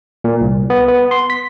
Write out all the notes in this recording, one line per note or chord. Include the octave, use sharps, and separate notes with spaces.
A#2
C2
B3
B3
C6
B6